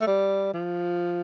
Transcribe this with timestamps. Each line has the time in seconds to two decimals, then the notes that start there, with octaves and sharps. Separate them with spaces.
0.01 A3
0.07 G3
0.53 F3